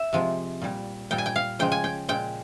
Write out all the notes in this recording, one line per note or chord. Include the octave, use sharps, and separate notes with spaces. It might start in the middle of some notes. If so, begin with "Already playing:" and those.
Already playing: E5
C3 F3 G#3
A#2 G3
A#2 G3 G5
G#5
G5
F5
C#3 F3 G#3 G5
G#5
G5
A#2 G#3 G5